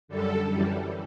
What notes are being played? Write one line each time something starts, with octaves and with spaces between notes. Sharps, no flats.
F#2 D3 G3 A4
F#2 E3 G3